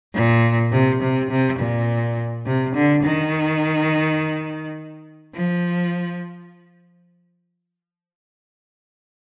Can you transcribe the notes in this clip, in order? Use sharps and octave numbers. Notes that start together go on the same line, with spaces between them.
A#2
C3
C3
C3
A#2
C3
D3
D#3
F3